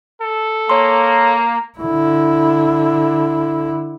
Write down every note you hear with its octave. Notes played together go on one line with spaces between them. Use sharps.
A4
A#3 C#5 C6
D3 E4